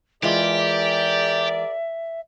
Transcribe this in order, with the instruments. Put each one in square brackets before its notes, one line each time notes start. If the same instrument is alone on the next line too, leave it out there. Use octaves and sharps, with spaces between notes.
[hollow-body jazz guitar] E3 G#3 F4 [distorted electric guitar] G4 [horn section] G#4 A#4 D5 [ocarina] E5